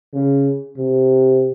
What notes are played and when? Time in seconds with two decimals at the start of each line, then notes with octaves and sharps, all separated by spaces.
0.14 C#3
0.77 C3